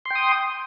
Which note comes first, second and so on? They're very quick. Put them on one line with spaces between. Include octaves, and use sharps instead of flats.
C6 G5 D#6